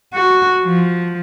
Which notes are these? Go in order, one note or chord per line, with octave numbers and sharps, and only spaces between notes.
F#4
F3